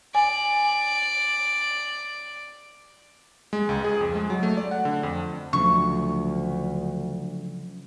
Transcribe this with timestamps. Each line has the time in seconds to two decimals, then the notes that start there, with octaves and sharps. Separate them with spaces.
0.15 D5 G#5
3.53 G#3
3.69 C#2
3.84 G#4
4.01 F2
4.15 G#3
4.30 F#3
4.43 A3
4.57 D5
4.71 F#5
4.85 D3
5.03 F2
5.53 D2 C#3 F3 F#3 C#6